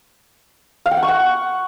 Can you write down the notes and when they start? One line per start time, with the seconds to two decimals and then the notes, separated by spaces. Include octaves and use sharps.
0.86 F5
0.91 G5
0.97 F#5
1.03 C#6
1.08 F#5